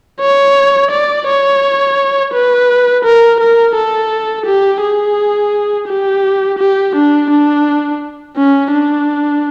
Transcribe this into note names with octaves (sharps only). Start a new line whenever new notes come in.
C#5
D5
C#5
B4
A#4
A#4
A4
G4
G#4
G4
G4
D4
D4
C#4
D4